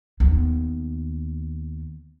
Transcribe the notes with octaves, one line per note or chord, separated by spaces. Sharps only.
D#2 B3